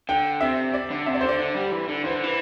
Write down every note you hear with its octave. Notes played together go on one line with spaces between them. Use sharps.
D3 G5
C3 E5
D5
D3
C3 E5
D5
D3 C5
D5
D3
G3
E3
D3
E3 C5
D3
E3